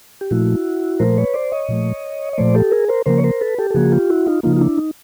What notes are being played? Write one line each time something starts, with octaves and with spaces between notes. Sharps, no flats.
G4
A#2 F3 A3 E4 F#4
A#2 F3 A3 A#4 C5
B4 C#5
C5 D5
C#5 D#5
A#2 F3 A3
D#5
A#2 F3 A3 C5 D5
G4 A4
G#4 A#4
A#4 C5
C#3 F3 A#3 A#4 C5
C#5
A#4 C5
A4 B4
G4 A4
A4
C#3 F3 A#3 F#4 G#4
F4 G4
E4 F#4
D#4 F4
C#3 F3 A#3 D#4 F4
F4
D4 E4
D#4